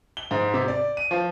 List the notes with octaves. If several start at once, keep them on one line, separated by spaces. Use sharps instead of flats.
G7
G#2
C3
D5
D#7
F3